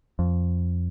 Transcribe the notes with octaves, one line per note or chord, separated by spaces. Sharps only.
F2